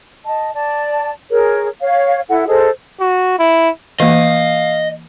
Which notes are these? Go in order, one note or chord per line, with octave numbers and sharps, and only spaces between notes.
D#5 A5
D5 A5
G#4 A#4 C#5
C#5 F5
E4 A4 F#5
G#4 A4 C5 D#5
F#4
E4
E3 A#3 D#5 F5